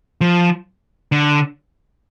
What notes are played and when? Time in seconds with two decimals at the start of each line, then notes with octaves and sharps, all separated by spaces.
0.21 F3
1.12 D3